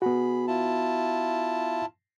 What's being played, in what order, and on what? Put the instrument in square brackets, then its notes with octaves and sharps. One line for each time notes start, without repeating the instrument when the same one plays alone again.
[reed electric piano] B3 F#4 [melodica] G#4 B5
[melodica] E4 F4 A5